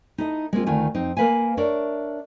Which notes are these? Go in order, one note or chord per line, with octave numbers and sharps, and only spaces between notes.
D#4 E4 A4 D#5
G#3 A#3 C4 F4
D2 D#3 A3 F4 G#5
F2 C4 D#4
A#3 A#4 B4 F5 G#5
D4 A#4 C#5 D5 E5